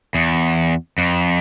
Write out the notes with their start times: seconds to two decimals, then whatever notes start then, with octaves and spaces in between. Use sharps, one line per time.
0.14 E2
0.98 F2